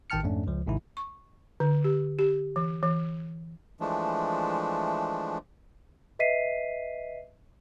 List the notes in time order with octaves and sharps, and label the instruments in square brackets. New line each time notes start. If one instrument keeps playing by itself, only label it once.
[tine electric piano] A1 D#3 G5 A5 F6 C#7
F2 G#2 A3 C#4 D4
C#2 F3
G#1 G#2 C3 D#3 E4
[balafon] C#6
D3
G4
G4
E3
E3
[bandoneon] E3 F3 G#3 A3 D4
[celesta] B4 D#5 E5 B6 C7 D#7